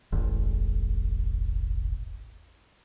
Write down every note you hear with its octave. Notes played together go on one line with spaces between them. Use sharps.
E1 A1